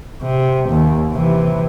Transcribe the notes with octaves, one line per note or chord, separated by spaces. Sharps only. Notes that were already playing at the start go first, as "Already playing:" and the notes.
C3
D#2
C3 E3